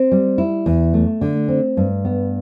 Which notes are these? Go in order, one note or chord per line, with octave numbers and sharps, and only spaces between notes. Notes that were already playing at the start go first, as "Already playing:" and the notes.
Already playing: C4
G3
E4
E2
A3
D3
C4
G2
B3